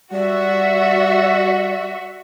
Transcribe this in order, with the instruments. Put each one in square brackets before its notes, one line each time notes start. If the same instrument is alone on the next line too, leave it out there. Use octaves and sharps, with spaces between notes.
[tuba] G3 [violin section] F#4 E5 [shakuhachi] D5